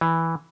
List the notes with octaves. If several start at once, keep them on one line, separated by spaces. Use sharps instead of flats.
E3